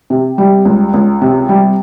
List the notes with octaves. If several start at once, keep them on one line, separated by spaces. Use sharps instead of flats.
C3
G3
C#2
C#2
C3
G3